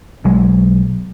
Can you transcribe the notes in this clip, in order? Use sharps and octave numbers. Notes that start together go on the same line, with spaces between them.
B1 F#3 G#3